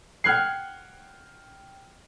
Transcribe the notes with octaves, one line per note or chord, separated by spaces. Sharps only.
F#5 G5 F6 F#6 G#6 C7